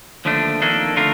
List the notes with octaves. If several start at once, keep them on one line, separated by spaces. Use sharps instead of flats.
D#2 D3 F3 A3 D4
F2 D#3 A#3 D4 A4
D3 A3 D4 F4 A#4